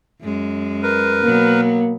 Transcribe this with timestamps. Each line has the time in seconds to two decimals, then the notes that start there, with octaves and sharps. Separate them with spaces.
0.22 F#2 G#3
0.83 A#4 B4
1.24 B2 F#3 A#3 B3